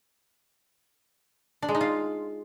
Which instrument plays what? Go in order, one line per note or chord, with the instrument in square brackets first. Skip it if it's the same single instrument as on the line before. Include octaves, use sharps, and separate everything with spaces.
[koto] D4
G#3
D#4
F4